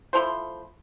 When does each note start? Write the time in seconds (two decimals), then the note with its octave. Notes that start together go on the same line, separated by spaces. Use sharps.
0.13 F3 A3 E4 C5